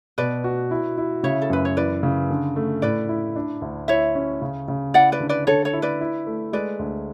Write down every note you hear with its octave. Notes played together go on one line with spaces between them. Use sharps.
B2 B4 D5
F#4
E4
E4
C#3 C#5 E5
A4
F#2 B4
C#5
E3 B4 D5
C#3
D3
A3
A2 B4 D5
E4
D4
D2
E4 C#5 E5
C#4
C#3
C#3
E4 D5 F#5
B4 D5
D3
B4 D5
D3 A4 C#5
A4 C#5
E4
B4 D5
E4
A3
G#3 B4 D5
D2